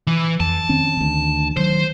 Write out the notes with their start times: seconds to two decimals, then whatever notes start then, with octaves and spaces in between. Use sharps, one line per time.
0.07 E3
0.40 F2 A5
0.69 D#3 C4 C#4
0.97 D2 D#3
1.57 D#3 F#3 C5